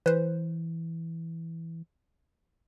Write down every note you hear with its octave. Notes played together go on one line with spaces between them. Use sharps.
E3 B4 C5